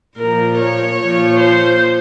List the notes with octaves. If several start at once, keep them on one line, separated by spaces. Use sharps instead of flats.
A#2 F3 A#4
C#5
A#2 F3
C5